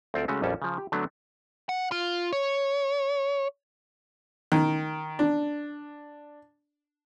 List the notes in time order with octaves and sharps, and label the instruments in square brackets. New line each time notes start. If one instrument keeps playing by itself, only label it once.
[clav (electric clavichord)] D2 C4 F4 A4 D5
C#3 G#3 A3 C#4 F#4
A#1 F2 G3 C#4 A4
C#3 F3
G4
D3 F#3 A3 B3 D4
[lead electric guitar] F#5
F4
C#5
[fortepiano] D#3
D4